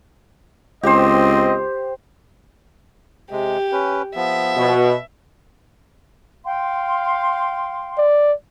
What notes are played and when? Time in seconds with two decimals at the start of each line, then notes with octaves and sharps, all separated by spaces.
0.83 C#2 C4 G4 C5 D#5
3.31 C3 G#3 G4
3.72 C#4 B4
4.16 F3 B3 E5
4.57 B2
6.44 F5 G5 C6
7.98 D5